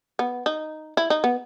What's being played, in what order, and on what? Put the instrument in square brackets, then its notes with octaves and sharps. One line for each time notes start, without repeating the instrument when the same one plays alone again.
[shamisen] B3
D#4
E4
D#4
B3